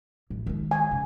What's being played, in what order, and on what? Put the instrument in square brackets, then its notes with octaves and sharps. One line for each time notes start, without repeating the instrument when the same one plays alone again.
[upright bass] A1
D#3 G#3
[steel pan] G#5
[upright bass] C#3 C#4